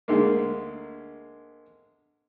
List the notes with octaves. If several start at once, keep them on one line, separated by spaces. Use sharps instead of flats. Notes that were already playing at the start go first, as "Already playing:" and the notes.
D2 G#3 A#3